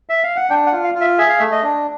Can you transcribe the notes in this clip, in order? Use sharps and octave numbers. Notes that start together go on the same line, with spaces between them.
E5
F5
F#5
D4 G5
F#5
F4
F5
F4
E5
G#4 E5
F5
A3 E5
D#5
D4